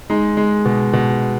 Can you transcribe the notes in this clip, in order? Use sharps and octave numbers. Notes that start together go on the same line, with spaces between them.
G#3 D#4
G#3
B2
B2